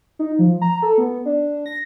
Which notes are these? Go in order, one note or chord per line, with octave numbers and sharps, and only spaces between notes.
D#4
F3
A#5
A4
B3
D4
A#6